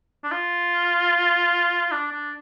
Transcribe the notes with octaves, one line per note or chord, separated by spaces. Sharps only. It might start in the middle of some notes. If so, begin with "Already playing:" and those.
D4
F4
D4
D4